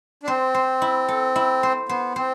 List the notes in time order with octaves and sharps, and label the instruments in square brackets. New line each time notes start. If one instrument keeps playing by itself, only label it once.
[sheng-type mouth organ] D4
[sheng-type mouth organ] C4 [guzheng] C5
[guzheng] C5
E4
A4
E4
C5
[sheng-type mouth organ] B3 [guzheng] C5
[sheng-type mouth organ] C4 [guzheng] C5